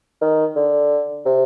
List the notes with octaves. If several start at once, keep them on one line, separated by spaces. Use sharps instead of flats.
D#3
D3
C3